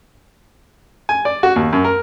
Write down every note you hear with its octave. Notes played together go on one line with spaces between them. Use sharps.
G#5
D5
F#4
D#2
F#2
A#4